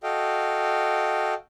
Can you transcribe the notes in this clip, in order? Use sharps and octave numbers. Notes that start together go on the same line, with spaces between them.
F#4 A4 D#5 F5 G5